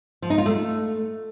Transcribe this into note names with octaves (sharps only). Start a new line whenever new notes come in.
F3
D#4
F4
A3